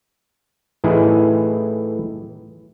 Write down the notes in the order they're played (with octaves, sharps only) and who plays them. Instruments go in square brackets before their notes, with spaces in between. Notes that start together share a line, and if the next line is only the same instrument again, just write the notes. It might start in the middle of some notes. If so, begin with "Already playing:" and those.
[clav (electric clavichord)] A2 E3 D#4 G#4